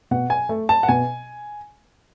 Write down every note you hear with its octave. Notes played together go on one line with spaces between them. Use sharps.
B2 F#5
G#5
A3
A5
F#5
B2 G#5